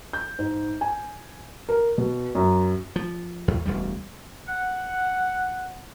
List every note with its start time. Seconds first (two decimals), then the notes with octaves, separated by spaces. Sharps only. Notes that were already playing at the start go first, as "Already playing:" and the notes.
0.13 G6
0.39 G#2
0.81 G#5
1.69 A#4
1.98 B2
2.35 F#2
2.96 F3
3.48 E2
3.66 E1 D2 G3
4.47 F#5